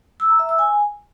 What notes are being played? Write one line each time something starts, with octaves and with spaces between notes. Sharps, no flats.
E6
A#5
E5
E6
G#5